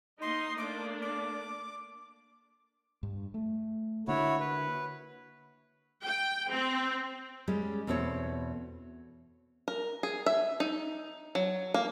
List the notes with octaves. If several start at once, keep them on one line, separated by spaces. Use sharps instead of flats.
A#3 D#4 D#5 C6
A3 A#3 D4 D6
D6
G2
A3
D3 A#3 E4 F#4 C#5
B4
G5
C4
G3 G#3 C#4
E2 B2 C4 A4 C#5
A#4
G#4
E5
D#4
F#3
A#3